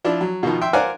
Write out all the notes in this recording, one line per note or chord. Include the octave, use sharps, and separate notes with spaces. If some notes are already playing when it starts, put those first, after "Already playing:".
F3 D4 E4
F#3
B2 D#3 F3
E5 G5 C6
A#4 C5 D5 F5 F#5 G#5